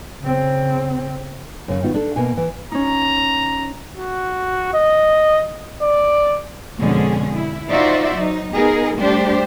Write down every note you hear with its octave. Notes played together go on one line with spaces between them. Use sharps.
C#3 C4
F#2 C#3
D#3 B3 F4 F#4
D4 A4
B2 A#3 G#5
E3
C#4 D#4 A#5
F#4
D#5
D5
F2 B2 D3 G#3 C#4 G#4
E4
D#4 F4 F#4 C5 D5 E5
F#3 D#4
B3 D#4 G#4 A#4
G3 A3 D4 G4 C5